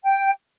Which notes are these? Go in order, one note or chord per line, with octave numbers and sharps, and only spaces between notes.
G5